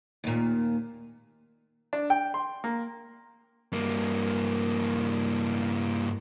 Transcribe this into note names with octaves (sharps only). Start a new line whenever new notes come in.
D#2 A#2
D4
G5
C6
A#3
G2 A#3